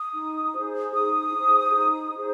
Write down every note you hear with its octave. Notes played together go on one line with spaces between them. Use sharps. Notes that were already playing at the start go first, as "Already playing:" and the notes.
Already playing: D#6
D#4
G#4 C5
D#4 D#6
G#4 C5
D#4
G#4 C5